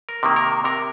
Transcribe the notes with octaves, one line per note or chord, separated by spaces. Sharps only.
A#4
C3 D#3 A#3
A#4
C3 A#4